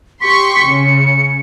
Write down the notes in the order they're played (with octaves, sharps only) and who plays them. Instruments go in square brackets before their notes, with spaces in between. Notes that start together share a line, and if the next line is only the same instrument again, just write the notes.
[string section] G4 C6 C#6 [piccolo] B6
[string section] C#3 [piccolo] C#7